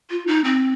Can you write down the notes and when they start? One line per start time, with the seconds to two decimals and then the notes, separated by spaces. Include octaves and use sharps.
0.10 F4
0.27 D#4
0.44 C4